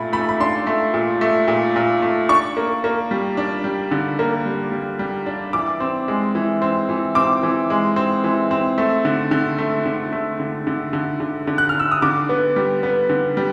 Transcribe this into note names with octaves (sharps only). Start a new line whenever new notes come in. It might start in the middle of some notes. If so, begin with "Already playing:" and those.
Already playing: A#2 A3 B5
A3 B5
B5
D4 C6
A3
A#2
A3
A#2
A#2
A3
D4 C#6
A#3
A#3
G3
D4
G3
D3
A#3
G3
G3
G3
D4
E3 D6
C4
G#3
E3
C4
E3
C4 D6
E3
G#3
C4
E3
C4
A3
D3
D3
A3
D3
A3
D3
D3
D3
D3
D3
F#6
F6
D3 E6
D#6
D3 D6
B3
G3
B3
D3
G3